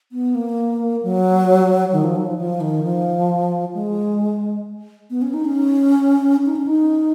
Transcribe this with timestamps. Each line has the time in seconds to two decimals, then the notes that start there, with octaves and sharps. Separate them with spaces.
0.12 B3
0.35 A#3
1.03 F#3
1.93 D#3
2.04 F3
2.16 F#3
2.26 F3
2.38 F3
2.61 D#3
2.83 F3
3.74 G#3
5.10 B3
5.22 C#4
5.34 D#4
5.45 C#4
6.46 D#4
6.56 C#4
6.66 D#4